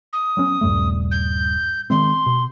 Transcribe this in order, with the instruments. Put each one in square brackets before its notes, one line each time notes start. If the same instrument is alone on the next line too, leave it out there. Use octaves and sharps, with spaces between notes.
[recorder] D#6
[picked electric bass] F#3 B3 C#4
D#1 G2 A3
[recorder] G6
[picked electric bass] D#3 G#3 C4 [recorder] C6
[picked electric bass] B2